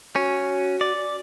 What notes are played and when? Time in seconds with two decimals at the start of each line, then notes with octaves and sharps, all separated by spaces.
0.16 C#4 F#4
0.81 D5